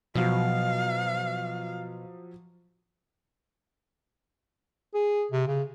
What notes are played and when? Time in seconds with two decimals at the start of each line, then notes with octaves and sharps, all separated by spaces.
0.15 B2 F3 F#3 F5
4.94 G#4
5.32 C3
5.47 C#3